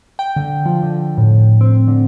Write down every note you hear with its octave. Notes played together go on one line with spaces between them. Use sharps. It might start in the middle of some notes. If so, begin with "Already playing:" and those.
G5
D3
F3
D3
A2
C4
D3